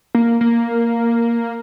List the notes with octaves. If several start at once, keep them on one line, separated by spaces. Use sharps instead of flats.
A#3
A#3